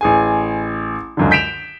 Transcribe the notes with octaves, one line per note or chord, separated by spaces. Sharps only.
A1 G#4 G#5
C#2 F#2 D3
G6 B6 D7 E7 F7